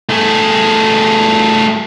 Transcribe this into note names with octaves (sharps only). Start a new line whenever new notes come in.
A3 G#4